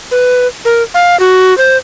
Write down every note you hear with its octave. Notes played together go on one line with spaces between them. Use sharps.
B4
A#4
F5
F#4
C5